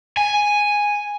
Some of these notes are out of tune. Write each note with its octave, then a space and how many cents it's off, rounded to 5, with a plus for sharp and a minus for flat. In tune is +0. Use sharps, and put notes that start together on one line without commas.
G#5 -5